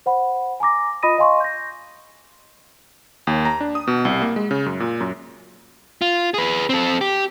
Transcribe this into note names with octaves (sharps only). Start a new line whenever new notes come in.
C5 F#5 B5
G#5 A#5 D6 A#6
F4 D#5 B5 D#6 A#6 D#7
D#5 F5 G#5 C6 C#6
G6 A#6
D#2
A#5
D4
D#6
B2
C2
A#3
G#3
C#3
F#2
A#2
F#2
F4
G#4 B4
C4 A4
G4